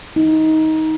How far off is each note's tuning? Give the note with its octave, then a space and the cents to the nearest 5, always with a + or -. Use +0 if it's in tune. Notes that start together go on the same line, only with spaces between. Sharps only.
D#4 +20